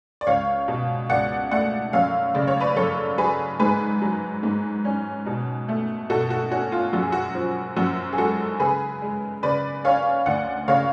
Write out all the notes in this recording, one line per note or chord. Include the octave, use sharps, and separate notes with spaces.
D5
C#2 C#5 F5
B2
C#2 D5 F#5
A3 D5 F#5
F#2 C#5 F5
C#3 D5
C#5
B4 D5
F#2 A4 C#5
F#3 G#4 B4
G#2 G#4 B4
F#3
G#2
C#4
B2
A3
B2 F#4 A4
F#4
C#4 F#4
F4
F#2 F#4
G#4
F#4
F3
F#2 F#4
G#4
G#3 F#4 A4
C#3 G#4 B4
G#3
C#3 B4 D5
C#4 C#5 F5
D2 D5 F#5
C#3 C#5 F5